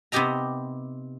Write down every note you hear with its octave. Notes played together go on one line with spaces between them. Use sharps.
C3 B3 D#4 G4 D#5 A#5